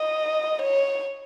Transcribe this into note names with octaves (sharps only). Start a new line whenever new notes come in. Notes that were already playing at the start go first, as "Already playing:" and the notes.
Already playing: D#5
C#5